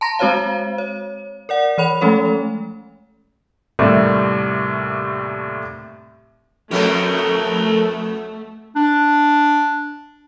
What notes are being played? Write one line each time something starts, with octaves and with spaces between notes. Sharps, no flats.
A5 A#5 C6 A#6
G#3 C4 F#4 C5 C#5 F5
C#5
A#4 D5 F#5
E3 C#5 B5 F7
F3 G#3 A3 C#4 A4 C#5
D#2 A2 C3 G3 A3
F2 B2 A3 B3 G4 A#4
D4